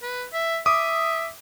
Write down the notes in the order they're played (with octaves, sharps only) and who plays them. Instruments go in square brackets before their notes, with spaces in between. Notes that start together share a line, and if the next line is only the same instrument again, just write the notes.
[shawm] B4
E5
[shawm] E5 [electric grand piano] D6 D#6